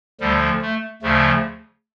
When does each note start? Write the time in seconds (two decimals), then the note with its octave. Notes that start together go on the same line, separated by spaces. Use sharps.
0.21 D2 D3 F3 G3
0.62 A3
1.02 D2 C#3 F3 A3